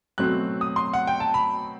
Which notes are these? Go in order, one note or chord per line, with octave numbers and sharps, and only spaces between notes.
B2 F#3 A3 C4 F#6
D#6
C6
F#5
G5
A5
B5